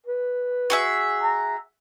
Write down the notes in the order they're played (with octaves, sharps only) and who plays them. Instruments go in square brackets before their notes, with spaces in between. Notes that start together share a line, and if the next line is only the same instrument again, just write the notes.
[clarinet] B4
[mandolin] F#4 G#4 E5
[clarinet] A#5